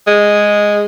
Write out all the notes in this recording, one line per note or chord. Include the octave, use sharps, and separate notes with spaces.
G#3